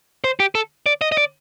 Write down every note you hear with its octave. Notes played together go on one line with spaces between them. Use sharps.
C5
G4
A4
D5
D#5
D#5
D5